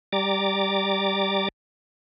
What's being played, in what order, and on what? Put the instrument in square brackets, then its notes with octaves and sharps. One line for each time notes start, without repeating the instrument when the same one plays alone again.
[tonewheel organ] G3 D5 A#5 D6 A6